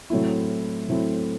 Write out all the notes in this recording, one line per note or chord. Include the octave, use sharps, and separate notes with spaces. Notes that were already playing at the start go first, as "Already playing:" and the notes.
A2 F#3 A3 C4 E4
A2 F#3 A3 C4 E4